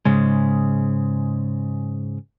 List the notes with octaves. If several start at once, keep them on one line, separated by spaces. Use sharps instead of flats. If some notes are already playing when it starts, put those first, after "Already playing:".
G#2 C#3 G#3